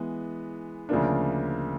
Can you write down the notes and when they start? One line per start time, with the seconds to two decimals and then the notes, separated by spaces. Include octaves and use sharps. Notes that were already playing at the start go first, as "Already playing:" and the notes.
Already playing: E3 G#3 B3
0.89 D2 C#3 F3 A#3 D4